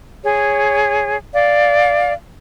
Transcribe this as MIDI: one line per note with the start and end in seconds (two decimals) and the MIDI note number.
0.23 1.16 68
0.23 1.16 73
1.33 2.13 74
1.33 2.13 77